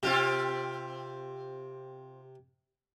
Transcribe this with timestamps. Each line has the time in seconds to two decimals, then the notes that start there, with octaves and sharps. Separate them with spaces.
0.03 C3 C4 F4 G4